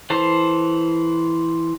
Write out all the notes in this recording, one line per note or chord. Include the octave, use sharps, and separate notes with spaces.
E3 A4 C5